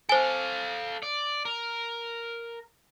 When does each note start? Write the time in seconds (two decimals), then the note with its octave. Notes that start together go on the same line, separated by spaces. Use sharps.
0.09 A4 C5 F5 G#5
1.03 D5
1.45 A#4